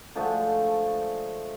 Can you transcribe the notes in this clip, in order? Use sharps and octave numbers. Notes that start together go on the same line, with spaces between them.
D3 F3 G#3 A3